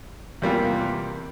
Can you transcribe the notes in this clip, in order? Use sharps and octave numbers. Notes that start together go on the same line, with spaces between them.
E2 C3 G3 A#3 F4